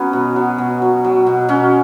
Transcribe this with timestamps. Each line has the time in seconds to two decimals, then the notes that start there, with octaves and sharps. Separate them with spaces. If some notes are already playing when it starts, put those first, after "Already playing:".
Already playing: F#3 B3 C#4
0.13 B2
0.36 F#3
0.58 B2
0.82 F#3
1.05 F#3
1.27 B2
1.49 B2 C#4